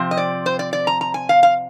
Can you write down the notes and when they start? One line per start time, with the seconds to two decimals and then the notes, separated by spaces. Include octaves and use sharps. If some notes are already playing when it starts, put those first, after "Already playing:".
Already playing: C3 F3 C4
0.11 D#5
0.17 D5
0.46 C5
0.59 D5
0.73 D5
0.87 A#5
1.01 A#5
1.14 G#5
1.29 F5
1.43 F5